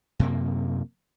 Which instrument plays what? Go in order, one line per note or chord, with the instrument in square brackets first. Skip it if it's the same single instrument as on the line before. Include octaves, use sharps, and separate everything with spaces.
[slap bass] F#2 C3 A#3